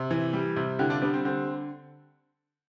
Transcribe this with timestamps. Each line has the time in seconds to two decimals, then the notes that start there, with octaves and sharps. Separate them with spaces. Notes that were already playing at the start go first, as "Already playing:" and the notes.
Already playing: C3
0.11 E3
0.33 G3
0.56 C3
0.79 D3 E4 G4
0.90 D4 F4
1.02 G3 B3 D4
1.14 C4
1.25 D3 C4